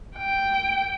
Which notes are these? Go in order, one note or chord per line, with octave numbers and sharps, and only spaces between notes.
G5